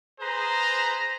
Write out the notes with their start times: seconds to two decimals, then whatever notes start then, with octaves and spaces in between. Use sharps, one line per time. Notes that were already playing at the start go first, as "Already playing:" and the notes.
0.20 G#4 B4 C5 A#5